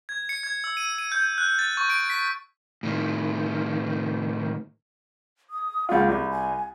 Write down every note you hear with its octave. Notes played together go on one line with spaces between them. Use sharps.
G#6
C#7
G#6
E6
D#7
D#7
G6
F#6
A6
C#6
D7
B6
A2 D#3
D#6
C#2 F4 F#5
C2 B5
G#5